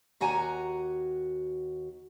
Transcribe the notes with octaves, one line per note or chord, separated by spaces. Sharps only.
D#2 F#4 F#5 G#5 A#5